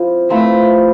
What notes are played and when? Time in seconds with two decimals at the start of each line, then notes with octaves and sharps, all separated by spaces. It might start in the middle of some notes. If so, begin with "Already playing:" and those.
Already playing: F3 C4 E4
0.30 F3 A3 C4 E4 B4